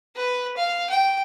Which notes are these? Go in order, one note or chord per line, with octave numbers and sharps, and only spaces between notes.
B4
F5
G5